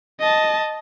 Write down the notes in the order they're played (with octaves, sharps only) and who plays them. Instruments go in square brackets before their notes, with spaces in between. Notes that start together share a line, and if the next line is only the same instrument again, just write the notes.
[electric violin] D#5 A5